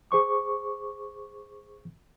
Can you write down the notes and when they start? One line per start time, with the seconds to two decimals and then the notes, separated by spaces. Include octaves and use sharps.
0.11 G#4 C5 C#6 D6